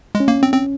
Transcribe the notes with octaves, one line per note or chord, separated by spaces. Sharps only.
G#3
C#4
A#3
C4
C4